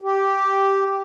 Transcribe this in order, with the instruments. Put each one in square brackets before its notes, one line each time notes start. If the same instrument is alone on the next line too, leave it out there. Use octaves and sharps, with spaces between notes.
[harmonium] G4